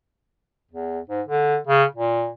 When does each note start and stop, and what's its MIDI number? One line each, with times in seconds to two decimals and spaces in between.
0.71 0.99 40
1.10 1.22 44
1.28 1.57 50
1.67 1.84 49
1.95 2.29 46